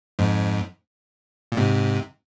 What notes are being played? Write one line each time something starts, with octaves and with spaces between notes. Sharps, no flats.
F2 G#2
A#2
G#2 C3